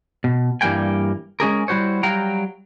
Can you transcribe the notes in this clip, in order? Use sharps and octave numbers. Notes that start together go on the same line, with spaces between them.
B2
G2 E3 G3 A#3 G5 G#5
G#3 C#4 G#4 A#4
G3 E4 F#4 C5 C#5
F#3 G3 F5 G5 A#5